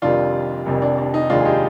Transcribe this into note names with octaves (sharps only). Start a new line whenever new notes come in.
F1 F2 D#3 G3 D4 F4
F1 F2 D#3 G3
D4
D4
D#4
F1 D#2 D#3 G#3 D4 F4
G#4
D#4 G4